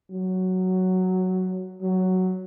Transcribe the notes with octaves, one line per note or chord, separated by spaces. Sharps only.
F#3
F#3